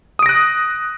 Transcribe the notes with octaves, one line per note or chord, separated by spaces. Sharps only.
D#6 F#6 A#6 D7